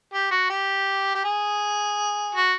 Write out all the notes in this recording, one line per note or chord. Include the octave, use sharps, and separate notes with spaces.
G4
F#4
G4
G4
G#4
F#4